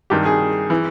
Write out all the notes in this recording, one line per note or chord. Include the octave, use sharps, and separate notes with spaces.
G2 D#3 G4
G#4
E3